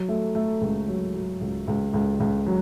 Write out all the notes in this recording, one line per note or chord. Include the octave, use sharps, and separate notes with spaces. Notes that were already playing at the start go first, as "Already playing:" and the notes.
Already playing: F#3
A3
A3
C#2
F#3
F#3
C#2
C#2
C#2
C#2
F#3